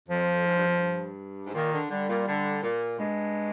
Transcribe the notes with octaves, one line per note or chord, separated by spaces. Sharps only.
F2 F3
G#2
G2
F2
G2
G#2
A#2 D#3
D3
D3 G3
A#2
D3
A#2
G2 G#3